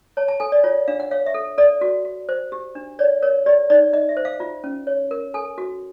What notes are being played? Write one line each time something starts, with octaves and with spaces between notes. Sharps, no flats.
C#5 A5
A5
A4 G#5
D5
F4 C#5
D4 F5
F#5
C#5 F5
E5
A4
A4 D5
F#4
F#4
C5
G4
D4
C#5 D5
A#4 C#5
G4 D5
D#4 D5
D#4 D#5
E5
C5
F5
F4
C#4
C#5
A#4
A4 G#5
F#4